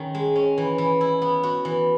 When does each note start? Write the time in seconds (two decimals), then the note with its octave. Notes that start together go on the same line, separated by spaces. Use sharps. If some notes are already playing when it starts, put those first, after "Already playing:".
Already playing: D#3 C#4
0.15 G#3
0.36 C#4
0.58 E3
0.78 E3
1.01 E4
1.22 B3
1.43 F#4
1.65 E3